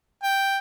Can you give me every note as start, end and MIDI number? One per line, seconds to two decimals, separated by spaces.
0.23 0.59 79